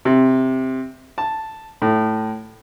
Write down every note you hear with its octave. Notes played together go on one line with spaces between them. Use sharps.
C3
A5
A2